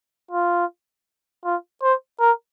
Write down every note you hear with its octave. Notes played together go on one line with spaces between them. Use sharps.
F4
F4
C5
A#4